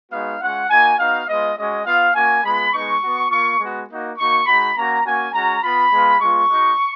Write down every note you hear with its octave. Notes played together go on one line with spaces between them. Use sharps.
G#3 B3 D#4 F#4 F5
G#3 C#4 F4 F#5
A#3 D#4 F#4 G#5
B3 D#4 F#4 F5
G#3 B3 F4 D#5
G#3 C#4 F#4 D#5
B3 F4 F5
A#3 C#4 F#4 G#5
G#3 B3 F4 B5
G#3 B3 D#4 C#6
B3 F#4
A#3 F4 C#6
G#3 B3 F#4
A#3 D#4 F#4
A#3 D#4 F#4 C#6
G#3 D#4 F#4 B5
A#3 C#4 F#4 A#5
A#3 C#4 F#4 G#5
G#3 C#4 F#4 A#5
B3 F4 B5
G#3 B3 F4
G#3 B3 F4 C#6
G#3 D#4 F#4